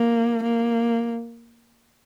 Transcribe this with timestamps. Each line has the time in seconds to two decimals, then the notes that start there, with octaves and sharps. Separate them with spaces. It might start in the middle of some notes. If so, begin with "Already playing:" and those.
Already playing: A#3
0.44 A#3